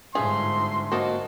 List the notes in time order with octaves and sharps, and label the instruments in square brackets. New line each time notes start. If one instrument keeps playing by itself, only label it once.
[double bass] G1 G#2 [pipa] A3 F4 G#4 [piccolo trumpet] C6
[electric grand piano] A#3 F#4 [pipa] C5 D#5 A5